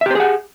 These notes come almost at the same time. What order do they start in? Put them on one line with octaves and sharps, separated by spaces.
E5 G4 C5 G#4 F#5